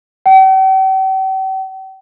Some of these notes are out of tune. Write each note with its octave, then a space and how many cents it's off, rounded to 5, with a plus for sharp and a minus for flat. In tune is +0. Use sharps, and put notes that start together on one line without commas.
G5 -45